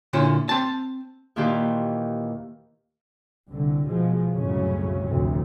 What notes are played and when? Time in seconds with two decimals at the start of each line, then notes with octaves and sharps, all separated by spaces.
0.13 A#2 D3 C#4 E4
0.49 C4 A5
1.36 D#2 A#2 D#3 E3 G4 C5
3.49 C2 D3
3.87 B2 F3 G#3
4.31 C2 F#2 A2 C#3 C#4
5.06 F1 D2 A2 C3